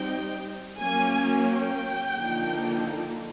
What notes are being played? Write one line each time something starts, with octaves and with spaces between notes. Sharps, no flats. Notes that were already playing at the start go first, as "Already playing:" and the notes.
Already playing: G3 C4 D#4 G5
F#3 A#3 C#4 G#5
G5
D3 F3 A#3 D#4